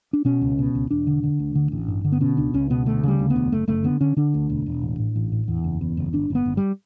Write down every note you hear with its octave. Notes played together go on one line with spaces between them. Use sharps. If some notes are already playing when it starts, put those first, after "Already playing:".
D4
B2 C#4
C#2
B2
C#2
E1 D4
D3
D3
D2
D3
A1
G2
D3
B3
B2 C#4
C#2 D4
C#2 C#4
B2 B3
D2 A3
C#3 G3
D2
B3
E1
F#1 A3
F#1 A3
D3 B3
D3 C#4
D3 D4
D2
E1
E1
A1
A2
A1
A2
E2
F#1
E2
F#1
G1 D4
G1 B3
G1
G3